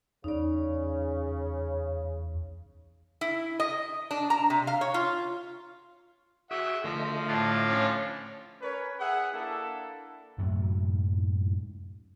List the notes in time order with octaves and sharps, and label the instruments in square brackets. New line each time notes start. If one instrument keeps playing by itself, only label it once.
[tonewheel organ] E2 [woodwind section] C#3 [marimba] D#4 D5
[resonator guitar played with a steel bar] E4
D#5
D4
A#5
C3
F5
C#5
F4
[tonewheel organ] F#4 G#4 G5 [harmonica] E5 F#5
[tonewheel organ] D3 A3 D#5 [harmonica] F3
[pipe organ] A2 D4 F4
[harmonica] F3 C#4
[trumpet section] C#4 A#4 B4 C#5
G#4 E5 F#5
A#3 D4 E4 A4
[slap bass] F#2 A2 C3 F#3